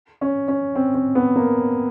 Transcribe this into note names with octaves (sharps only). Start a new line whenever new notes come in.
C#4
C#4
C4
C4
B3
A#3